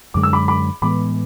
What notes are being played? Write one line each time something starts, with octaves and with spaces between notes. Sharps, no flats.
F#2 D3 G#3 D6
E6
B5 D6
B5 D6
A2 E3 G#3 B3 B5 D6